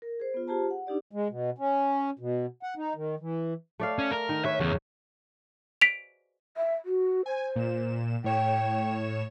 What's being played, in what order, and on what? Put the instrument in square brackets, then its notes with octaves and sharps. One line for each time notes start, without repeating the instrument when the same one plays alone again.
[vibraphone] A#4
G#4 C5
B3 F4
F4 G4 G#4 C5 A5 A#5
F#5
D4 D#4 G4 D5
[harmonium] G#3
B2
C#4
B2
F#5
D#4
D#3
E3
[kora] A3 D5 F5
[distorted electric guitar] C#4
A#4
[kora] D#3
[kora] B4 C#5 [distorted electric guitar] E5
[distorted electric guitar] E2 [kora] C#3
[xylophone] B6 D7 F7
[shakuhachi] E5
F#4
[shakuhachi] C5 [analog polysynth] G#5
[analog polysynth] A#2 E7
[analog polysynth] A2 C#5 E7 [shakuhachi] G5